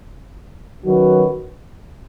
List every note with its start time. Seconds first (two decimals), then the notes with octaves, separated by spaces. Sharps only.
0.84 D#3 F#3 C#4 F#4 B4